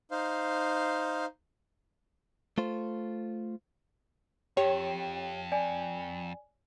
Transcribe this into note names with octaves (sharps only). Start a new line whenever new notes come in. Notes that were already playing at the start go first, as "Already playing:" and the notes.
D#4 C5 F5
A3 F4 C5
F2 G4 C#5 G5
D5 G#5